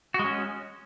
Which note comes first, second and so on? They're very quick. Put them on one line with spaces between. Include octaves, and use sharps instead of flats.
F#4 G#3 C#4